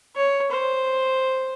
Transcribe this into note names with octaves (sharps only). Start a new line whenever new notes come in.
C#5
C5